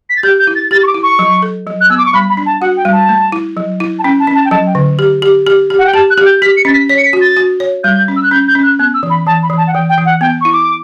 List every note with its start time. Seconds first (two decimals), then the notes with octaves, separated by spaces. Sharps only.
0.09 B6
0.16 A6
0.23 G4 G6
0.39 G6
0.47 E4
0.55 A6
0.71 G4 A6
0.83 C#6
0.87 D6
0.94 E4
1.03 C#6
1.19 F#3
1.42 A4
1.67 F#3
1.81 F#6
1.90 B3 E6
1.98 D6
2.06 C#6
2.14 G3 B5
2.30 B5
2.37 D4
2.46 A5
2.61 F#4 F#5
2.77 G5
2.85 G3
2.92 A5
3.09 A3
3.32 E4
3.57 F#3
3.80 E4
3.99 A5
4.03 C#4 G5
4.20 A5
4.27 C#4
4.35 A5
4.45 G5
4.51 F#3 A5
4.67 G5
4.75 D3
4.99 G4
5.22 G4
5.47 G4
5.70 G4
5.79 F#5
5.86 G5
5.93 G4 A5
6.10 F#6
6.18 G4
6.26 G6
6.42 G4 B6
6.57 C#7
6.65 C#4 A6
6.73 B6
6.89 C#5 B6
6.98 C#7
7.05 B6
7.13 F#4
7.21 A6
7.37 F#4
7.60 C#5
7.83 G3 G6
8.08 C#4
8.16 E6
8.23 F#6
8.31 C#4 G6
8.48 G6
8.55 C#4
8.63 F#6
8.79 B3 F#6
8.94 E6
9.03 E3
9.10 B5
9.26 E3 A5
9.43 B5
9.50 E3
9.58 A5
9.67 F#5
9.74 E3 G5
9.89 G5
9.98 E3
10.06 F#5
10.21 B3 G5
10.41 E4 C#6
10.53 D6